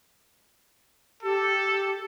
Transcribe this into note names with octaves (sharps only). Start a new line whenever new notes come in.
G4 A4